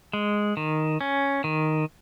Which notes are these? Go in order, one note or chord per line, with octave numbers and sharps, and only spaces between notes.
G#3
D#3
C#4
D#3